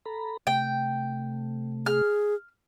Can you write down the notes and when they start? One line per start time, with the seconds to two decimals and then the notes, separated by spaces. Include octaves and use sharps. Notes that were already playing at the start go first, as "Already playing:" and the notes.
0.05 A4 A#5 B5
0.47 C3 A3 G5
1.86 G#4 F6